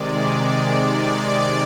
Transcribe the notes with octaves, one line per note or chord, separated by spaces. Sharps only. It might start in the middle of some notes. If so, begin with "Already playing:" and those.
Already playing: C3 D#3 G#3 D5
D5
D5